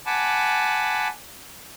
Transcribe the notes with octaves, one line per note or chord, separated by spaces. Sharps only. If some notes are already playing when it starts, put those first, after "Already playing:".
F#5 G#5 A5 B5 D6